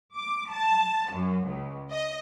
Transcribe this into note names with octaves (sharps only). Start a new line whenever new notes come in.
D6
A5
F#2
C#2
D#5